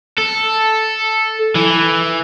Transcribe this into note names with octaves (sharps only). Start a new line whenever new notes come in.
A4
E3